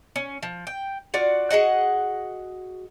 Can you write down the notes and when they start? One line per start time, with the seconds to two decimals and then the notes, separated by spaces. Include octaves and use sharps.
0.16 C#4
0.43 F3
0.67 G5
1.14 F4 F#4 D5
1.50 F#4 G#4 D#5 F#5